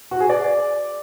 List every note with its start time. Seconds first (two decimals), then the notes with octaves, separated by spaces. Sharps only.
0.11 F#4
0.20 G#4
0.30 D5